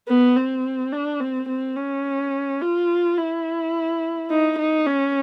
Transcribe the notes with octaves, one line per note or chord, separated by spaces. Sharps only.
B3
C4
D4
C4
C4
C#4
F4
E4
D#4
D#4
C#4